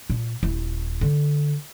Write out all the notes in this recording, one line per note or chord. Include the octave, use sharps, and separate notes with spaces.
A#2
D#1 E4
D3